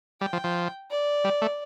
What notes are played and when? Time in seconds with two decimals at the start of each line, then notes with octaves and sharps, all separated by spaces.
0.21 G3 G5
0.33 F3
0.44 F3
0.91 D5
1.24 G3
1.42 A3